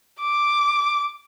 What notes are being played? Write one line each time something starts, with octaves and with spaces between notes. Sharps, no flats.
D6